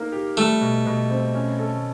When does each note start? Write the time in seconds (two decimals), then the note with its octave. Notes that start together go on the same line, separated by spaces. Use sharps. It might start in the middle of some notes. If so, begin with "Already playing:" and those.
Already playing: A#3 D#4 A#4
0.12 G4
0.37 G3 A3
0.61 B2
0.86 B2
1.10 C4
1.34 C#4
1.59 A4